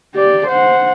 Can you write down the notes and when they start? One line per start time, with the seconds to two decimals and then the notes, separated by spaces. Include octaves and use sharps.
0.15 G4 D5
0.48 C5 F#5